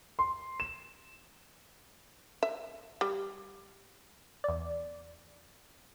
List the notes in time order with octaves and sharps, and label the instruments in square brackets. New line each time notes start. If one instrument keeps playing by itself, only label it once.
[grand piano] C6
E7
[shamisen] E5
G3
[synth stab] E2 D5